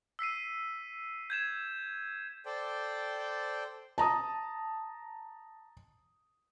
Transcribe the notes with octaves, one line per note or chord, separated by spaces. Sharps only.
E6 B6 C7 D#7
G6 G#6 E7
A4 C5 D5 G5
A5 A#5 D#6